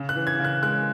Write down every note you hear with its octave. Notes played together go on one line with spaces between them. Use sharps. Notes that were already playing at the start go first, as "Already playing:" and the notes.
Already playing: C#3
F#6
E3
G#6
C#3
F#6
G#3 F#6